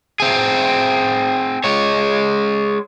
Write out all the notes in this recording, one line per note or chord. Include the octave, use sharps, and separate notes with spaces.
C4 G#4
G#3 C#5